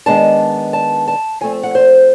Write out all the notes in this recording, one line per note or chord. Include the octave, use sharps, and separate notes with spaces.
D#3 G#3 B3 D4 A5
A5
A5
F3 A3 C4 G#5
F#5
C5